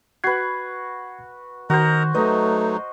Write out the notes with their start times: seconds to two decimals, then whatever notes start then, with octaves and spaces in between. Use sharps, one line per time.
0.24 F#4 B4 G#6 C7
1.70 D#3 F#4 A#4 C5 D#5 A#5
2.15 F#3 A3 D#4 B4 D#5